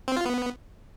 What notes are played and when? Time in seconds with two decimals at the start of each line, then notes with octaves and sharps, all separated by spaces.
0.08 C4
0.17 F4
0.25 B3